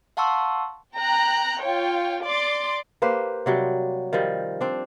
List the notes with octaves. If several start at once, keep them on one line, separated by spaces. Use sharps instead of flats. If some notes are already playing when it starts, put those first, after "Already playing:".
F5 F#5 A5 C6 C#6 E6
G5 A#5 F#6
F4 C#5 G5
D5 C6 D6
A#3 G4 B4 C5
C3 F#3 G3
D#3 F3 G3
C4 D4